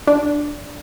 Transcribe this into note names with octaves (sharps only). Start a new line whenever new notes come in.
D4